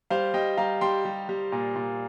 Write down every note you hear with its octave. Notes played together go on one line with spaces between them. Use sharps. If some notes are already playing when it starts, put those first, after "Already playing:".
G3 C5 F5
G3 D#5 G5
G3 F5 A#5
G3 G5 C6
G3
G3
A#2
A#2